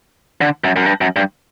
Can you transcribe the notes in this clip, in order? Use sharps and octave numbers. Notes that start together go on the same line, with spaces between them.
D3
F#2
F#2
G2
F#2
G2